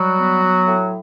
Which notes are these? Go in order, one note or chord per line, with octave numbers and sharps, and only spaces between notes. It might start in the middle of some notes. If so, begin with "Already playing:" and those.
Already playing: F#3 G3 F#4
B3
B3
A2